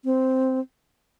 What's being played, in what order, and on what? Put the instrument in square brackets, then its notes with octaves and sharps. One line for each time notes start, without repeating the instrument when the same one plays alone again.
[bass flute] C4